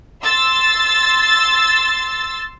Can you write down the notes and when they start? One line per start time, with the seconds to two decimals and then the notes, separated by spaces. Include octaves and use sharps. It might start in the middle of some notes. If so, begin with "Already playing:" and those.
0.23 C6 E6 A6